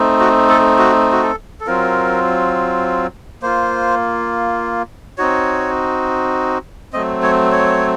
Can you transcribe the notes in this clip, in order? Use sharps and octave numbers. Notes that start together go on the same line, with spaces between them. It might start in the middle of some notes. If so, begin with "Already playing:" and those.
Already playing: A3 C4 D#4
F#4
A4
F#4
F#4
A4
A4
F#3 C4 F4 A#4
A#3 F4 C5
C4 D#4 F#4 C#5
F#3 A3 C4 D#5
C#5
C#5